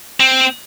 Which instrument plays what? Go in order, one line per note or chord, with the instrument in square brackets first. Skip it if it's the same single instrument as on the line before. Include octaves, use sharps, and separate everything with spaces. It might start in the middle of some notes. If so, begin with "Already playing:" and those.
[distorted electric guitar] C4